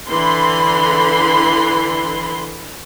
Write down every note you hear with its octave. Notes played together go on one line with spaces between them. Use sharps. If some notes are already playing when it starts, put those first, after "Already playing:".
D3 E3 B5 C6